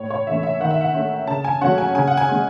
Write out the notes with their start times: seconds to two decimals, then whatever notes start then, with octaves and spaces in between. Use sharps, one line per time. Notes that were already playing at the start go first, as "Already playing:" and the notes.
Already playing: A2 C#5
0.10 C#5
0.27 E3 A3 C#4 E5
0.43 E5
0.60 D#3 F#5
0.71 E5
0.81 F#5
0.94 A3 C#4
1.27 C#3 A5
1.44 G#5
1.61 F#3 A3 C#4 F#5
1.78 G#5
1.95 C#3 G#5
2.07 F#5
2.17 G#5
2.29 G#3 C#4